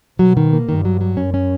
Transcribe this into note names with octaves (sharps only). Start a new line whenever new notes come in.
B2 F#3
D#3
A#3
G2 D#3
F#3
F#3
F#2 C#4
C#4